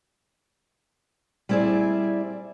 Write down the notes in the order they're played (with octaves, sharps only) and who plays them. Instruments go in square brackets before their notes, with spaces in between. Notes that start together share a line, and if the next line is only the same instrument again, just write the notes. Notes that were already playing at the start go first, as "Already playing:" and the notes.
[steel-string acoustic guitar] G3 C4 E4 G#4 D5